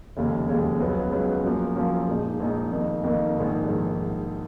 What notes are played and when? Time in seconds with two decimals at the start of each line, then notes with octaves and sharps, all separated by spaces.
0.17 F1 D#2 C#3 G#3
0.49 F1 D#2 C#3 G#3
0.80 C#2 C#3 F#3 B3
1.12 C#2 C#3 F#3 B3
1.44 F#2 F3 A#3
1.76 F#2 F3 A#3
2.08 A#1 A#2 G#3 D#4
2.40 A#1 A#2 G#3 D#4
2.72 F2 D#3 A#3
3.04 F2 D#3 A#3
3.35 A#1 G#2 D#3
3.67 A#1 G#2 D#3